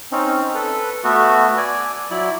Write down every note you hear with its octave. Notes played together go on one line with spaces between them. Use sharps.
C4 C#4 D#4
A4 B4
A3 B3 F#4
D5 G#5
F#3 E4 D5